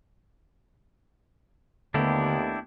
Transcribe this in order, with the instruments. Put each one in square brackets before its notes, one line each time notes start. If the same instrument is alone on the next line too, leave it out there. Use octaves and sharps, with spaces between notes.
[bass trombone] D#2 [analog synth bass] D3 [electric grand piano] A3 B3 [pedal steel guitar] D4 E4 G4